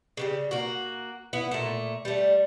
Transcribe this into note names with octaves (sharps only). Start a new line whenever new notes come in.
C#3 E3 G3
A#3 F#4
B3 E4
A#2 A3
G3 A3